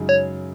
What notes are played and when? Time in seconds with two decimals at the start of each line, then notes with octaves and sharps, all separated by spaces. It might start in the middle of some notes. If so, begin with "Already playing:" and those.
Already playing: F#2 C#3 G#3 D#4 G#4
0.09 C#5